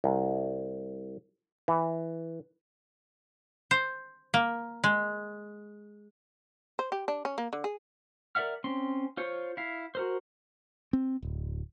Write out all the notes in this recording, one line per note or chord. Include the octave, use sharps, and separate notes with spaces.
C2
E3
C5
A#3
G#3
C5
G4
D4
C#4
A#3
D3
G#4
A#4 D5 E5 F#5 F6
C4 C#4 C6
F4 C5 C#5
E4 F5
F#4 A#4 C5
C4
D1